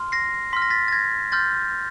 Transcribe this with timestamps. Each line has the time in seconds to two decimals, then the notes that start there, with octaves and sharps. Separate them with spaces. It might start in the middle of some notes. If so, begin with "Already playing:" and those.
Already playing: C6 F6
0.12 A#6 C7
0.53 C6 F6 B6
0.62 A#6
0.70 A6 B6
0.88 A6
0.92 G#6 A#6
1.32 C6 F6 G6 A6